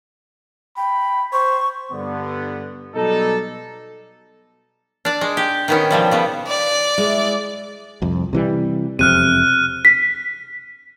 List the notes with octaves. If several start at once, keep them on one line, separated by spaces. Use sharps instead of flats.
G5 B5
C5 C#6
G2 D3 B3
B2 F#3 G3 D#4 A4
D4 D5
G#3
G4
D#3 B3 C#4
B2 F3 G3
C#3 B3
D5
G#3 E4
C2 F2
C3 E3 G3
E1 F2 C3 F6 F#6 D#7
B6